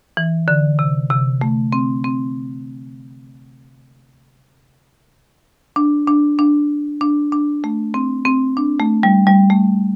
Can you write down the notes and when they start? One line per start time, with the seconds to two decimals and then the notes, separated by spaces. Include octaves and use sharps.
0.17 E3
0.48 D3
0.79 C3
1.10 C3
1.41 A3
1.73 C4
2.04 C4
5.76 D4
6.08 D4
6.39 D4
7.01 D4
7.32 D4
7.64 A3
7.94 C4
8.25 C4
8.57 D4
8.80 A3
9.03 G3
9.27 G3
9.50 A3